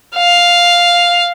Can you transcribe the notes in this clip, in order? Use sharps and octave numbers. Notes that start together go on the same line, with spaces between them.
F5